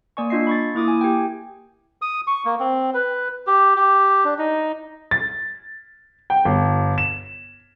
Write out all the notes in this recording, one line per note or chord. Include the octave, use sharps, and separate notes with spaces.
A#3 D5 G#5 C#6
D4 F4 D#5 C7
B5 C#6 A6
A#3 E4 D6 D#6
G#5
G4 G5
D#6
C#6
A#3
C4
B4
G4
G4
D4
D#4
A6
G5
G1
E7